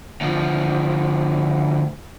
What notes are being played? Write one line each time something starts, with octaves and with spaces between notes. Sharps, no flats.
D2 F3